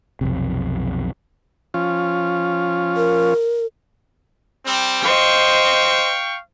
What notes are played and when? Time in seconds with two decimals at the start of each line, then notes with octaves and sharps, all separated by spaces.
0.21 B1 F2 C3
1.74 F3 C#4 F4
2.96 A#4
4.66 G3 C4
5.02 C5 D#5 F5 G5 C#6